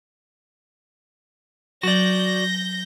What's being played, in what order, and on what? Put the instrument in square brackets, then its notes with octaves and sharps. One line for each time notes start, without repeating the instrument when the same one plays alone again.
[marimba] F#3 [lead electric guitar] F#4 D5 [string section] G6 A#6